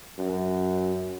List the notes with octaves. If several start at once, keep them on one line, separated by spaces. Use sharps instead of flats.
F#2